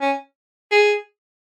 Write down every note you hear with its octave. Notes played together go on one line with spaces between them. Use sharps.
C#4
G#4